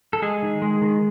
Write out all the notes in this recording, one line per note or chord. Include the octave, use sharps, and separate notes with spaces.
A4
G#3 G#4
D#3
G#3
D#3